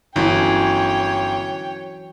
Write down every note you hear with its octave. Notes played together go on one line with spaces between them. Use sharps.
G1 E3 F#3 C#4 C#5 G5